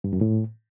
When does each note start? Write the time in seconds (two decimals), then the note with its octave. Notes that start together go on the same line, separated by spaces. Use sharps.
0.04 G2
0.13 F#2
0.21 A2